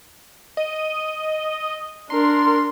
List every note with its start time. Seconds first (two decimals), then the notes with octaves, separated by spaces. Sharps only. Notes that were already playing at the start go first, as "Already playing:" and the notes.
0.57 D#5
2.10 D4 A#4 C6